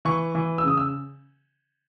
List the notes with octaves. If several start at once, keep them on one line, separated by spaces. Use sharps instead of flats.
E3 C#6
E3
E6
C#3 D#6
E6